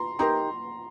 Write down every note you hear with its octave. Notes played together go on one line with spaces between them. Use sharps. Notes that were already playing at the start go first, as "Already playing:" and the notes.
Already playing: A#5 C6
D#4 G4 A#4 A#5 C6